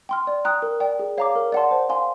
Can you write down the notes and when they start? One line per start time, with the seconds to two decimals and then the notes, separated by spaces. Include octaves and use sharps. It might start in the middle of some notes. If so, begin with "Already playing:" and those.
0.09 G5 C6 F6
0.27 D5
0.45 G5 A#5 D#6 F#6
0.62 A#4
0.80 D5 G5
0.99 G#4
1.18 C#5 F5 A#5 D6
1.36 A#4
1.52 D5 F#5 A5 C6
1.71 C5
1.89 F5 G#5 C6